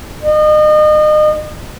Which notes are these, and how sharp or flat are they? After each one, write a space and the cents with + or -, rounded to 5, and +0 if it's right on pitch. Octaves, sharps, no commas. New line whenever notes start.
D#5 -35